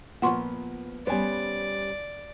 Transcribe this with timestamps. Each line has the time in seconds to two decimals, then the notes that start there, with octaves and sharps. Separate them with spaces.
0.22 A#2 F3 B3 F#5 C6 C#6
1.07 G3 B3 C#4 C5 D5 G#5